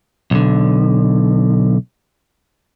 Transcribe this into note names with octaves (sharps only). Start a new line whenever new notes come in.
B1 D3